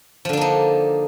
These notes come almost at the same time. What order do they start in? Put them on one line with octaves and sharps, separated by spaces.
F3 D3 D4 A#3 D#4